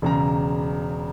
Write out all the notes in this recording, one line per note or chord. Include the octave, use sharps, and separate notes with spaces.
E1 C#3 A#5